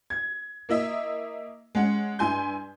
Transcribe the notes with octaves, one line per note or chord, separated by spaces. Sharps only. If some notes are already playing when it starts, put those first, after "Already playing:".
G#6
A#3 E4 D#5 E5
G#3 C#4 F#5
G2 E4 G#5 C6 G6